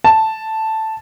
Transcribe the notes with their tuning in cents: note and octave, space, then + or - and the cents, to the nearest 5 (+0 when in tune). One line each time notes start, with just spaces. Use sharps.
A5 +0